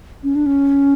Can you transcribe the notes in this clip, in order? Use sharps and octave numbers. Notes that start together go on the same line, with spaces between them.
C#4
D4
C#4